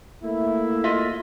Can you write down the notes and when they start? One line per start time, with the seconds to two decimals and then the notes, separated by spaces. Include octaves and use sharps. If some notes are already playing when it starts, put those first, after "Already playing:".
0.23 A3 A#3 E4
0.84 F4 D#5 E5